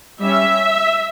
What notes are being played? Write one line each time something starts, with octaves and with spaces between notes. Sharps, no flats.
G3 C#4 E5